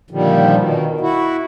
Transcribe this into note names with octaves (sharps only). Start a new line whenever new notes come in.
A#2 D3 D#3 F3 G3
B2 D#3
E4 F#4